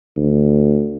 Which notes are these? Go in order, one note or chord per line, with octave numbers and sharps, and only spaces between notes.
D2